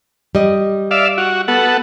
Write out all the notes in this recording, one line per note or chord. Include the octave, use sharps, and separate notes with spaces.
G3 D#5
D5 E5 F5
F#4
B3 A4 F#5